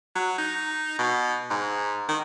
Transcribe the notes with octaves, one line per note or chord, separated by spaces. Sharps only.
F#3
D#4
B2
G#2
D#3